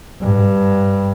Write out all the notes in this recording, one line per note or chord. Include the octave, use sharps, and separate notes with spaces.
G2